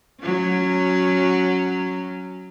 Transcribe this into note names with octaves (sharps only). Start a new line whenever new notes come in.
F#3 C#4